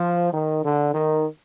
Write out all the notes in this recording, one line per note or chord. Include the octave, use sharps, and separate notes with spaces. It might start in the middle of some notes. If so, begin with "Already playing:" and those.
Already playing: F3
D#3
D3
D#3